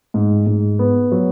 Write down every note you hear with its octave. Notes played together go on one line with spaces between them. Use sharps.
G#2
G#2
B3
F#3